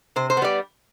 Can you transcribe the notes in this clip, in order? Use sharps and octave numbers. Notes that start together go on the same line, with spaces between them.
C3 C5
C5
B3
G3 D5